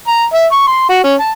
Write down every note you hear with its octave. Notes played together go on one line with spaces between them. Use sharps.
A#5
E5
C#6
C6
F#4
C#4
A5